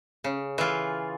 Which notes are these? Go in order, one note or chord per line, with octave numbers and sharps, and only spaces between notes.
C#3
E3 F4